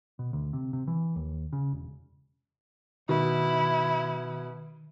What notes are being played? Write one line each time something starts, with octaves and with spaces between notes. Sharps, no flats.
B2
D2
C3
C3
E3
D#2
C#3
E1
B2 D#3 E4